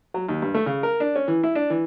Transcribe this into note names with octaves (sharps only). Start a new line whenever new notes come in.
F#3
D#2
G2
A3
C#3
A#4
D4
C#4
E3
E4
D4
E3